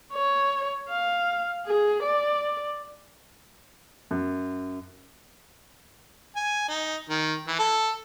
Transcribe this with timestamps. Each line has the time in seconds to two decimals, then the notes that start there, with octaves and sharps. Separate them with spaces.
0.13 C#5
0.90 F5
1.66 G#4
2.03 D5
4.11 F#2
6.36 G#5
6.69 D#4
7.10 D#3
7.48 E3
7.59 A4